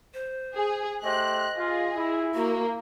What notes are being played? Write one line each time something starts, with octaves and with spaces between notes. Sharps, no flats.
C5
G#4
A3 G4 C5 D#5 F#6
F4 G#4
E4
A#3 F#4